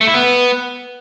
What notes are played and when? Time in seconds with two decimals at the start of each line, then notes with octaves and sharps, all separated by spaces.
0.01 A3
0.07 E4
0.14 B3